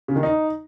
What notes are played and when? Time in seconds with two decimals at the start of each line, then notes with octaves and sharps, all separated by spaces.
0.08 C#3
0.16 D#3
0.23 D#4